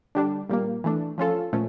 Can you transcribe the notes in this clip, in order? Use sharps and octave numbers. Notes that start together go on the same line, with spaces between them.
D3 G3 D4
A#2 G3 A#3
E3 A3 D4
F3 C#4 F4 A4
A#2 F3 A3 C#4